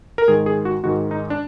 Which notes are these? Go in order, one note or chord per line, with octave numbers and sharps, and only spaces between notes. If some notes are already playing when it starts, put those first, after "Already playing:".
A#4
G#2 D#3 G#3 G#4
G#4
F#4
G#2 D#3 G#3 F#4
D#4
D4